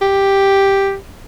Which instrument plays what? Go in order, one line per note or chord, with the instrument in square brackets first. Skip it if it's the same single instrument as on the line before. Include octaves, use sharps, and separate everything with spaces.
[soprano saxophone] G4